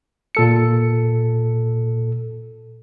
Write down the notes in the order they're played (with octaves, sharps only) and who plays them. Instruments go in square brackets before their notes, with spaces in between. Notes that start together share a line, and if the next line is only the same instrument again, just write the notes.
[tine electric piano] A#2 A4 C#7